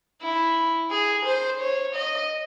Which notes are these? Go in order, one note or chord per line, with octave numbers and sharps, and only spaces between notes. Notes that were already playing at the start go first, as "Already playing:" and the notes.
E4
G#4
C5
C#5
D#5